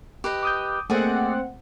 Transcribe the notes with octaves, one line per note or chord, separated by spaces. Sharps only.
G4 B4 D#5
D6 D#6 G6
A3 A#3 C4 G#4 D5 D#5 F#5